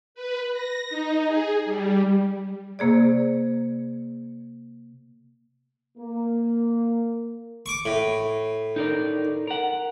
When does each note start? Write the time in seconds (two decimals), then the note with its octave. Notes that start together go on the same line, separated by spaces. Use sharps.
0.15 B4
0.53 A#6
0.89 D#4
1.25 G#4
1.65 G3
2.79 C3 A#3 G#4 D5
5.97 A#3
7.66 C#6 D6
7.85 A2
8.76 D#4 A#4 D5
9.47 A#4 F#5